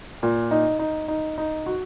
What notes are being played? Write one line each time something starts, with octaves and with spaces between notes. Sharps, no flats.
A#2
D#4
D#4
D#4
D#4
F#4